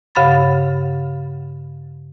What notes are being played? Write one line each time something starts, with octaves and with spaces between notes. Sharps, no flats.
G2 C#3 F5 F#5 B5 A6